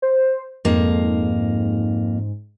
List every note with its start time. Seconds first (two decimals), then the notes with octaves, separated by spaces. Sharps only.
0.02 C5
0.65 F2 G#2 A#3